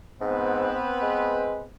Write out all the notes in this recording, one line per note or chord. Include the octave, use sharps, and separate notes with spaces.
G#2 B3 C4 B4
G#3